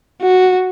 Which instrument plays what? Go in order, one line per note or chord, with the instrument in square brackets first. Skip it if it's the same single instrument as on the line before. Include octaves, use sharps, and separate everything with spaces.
[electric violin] F#4